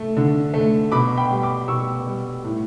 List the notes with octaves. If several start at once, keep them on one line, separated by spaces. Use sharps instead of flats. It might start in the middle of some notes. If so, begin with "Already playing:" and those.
Already playing: A3
D3
A3
B2 B5 D6
G5 B5
G3
B5 D6
B2 C#6 E6
G3
A2